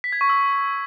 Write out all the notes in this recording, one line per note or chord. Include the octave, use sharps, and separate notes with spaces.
B6
G#6
C#6
E6